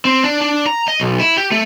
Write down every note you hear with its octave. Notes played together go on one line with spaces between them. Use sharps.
C4
D4
D4
A#5
D#5
B1
E4
G4
A3